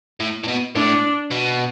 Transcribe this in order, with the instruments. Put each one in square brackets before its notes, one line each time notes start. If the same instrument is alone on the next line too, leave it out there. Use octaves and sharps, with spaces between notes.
[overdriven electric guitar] A2
A2
B2
[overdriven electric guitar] A2 [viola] D4
[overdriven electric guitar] B2